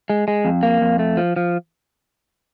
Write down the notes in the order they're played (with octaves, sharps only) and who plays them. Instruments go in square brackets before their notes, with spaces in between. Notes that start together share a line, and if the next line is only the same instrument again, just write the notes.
[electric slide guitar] G#3
G#3
F2
A#3
F2
A3
F3
F3